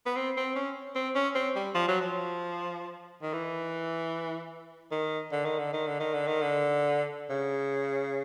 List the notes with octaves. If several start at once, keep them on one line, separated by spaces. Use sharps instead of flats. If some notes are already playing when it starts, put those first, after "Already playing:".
B3
C4
C4
C#4
C4
C#4
C4
G3
F3
F#3
F3
D#3
E3
D#3
D3
D#3
D3
D#3
D3
D#3
D3
D#3
D3
C#3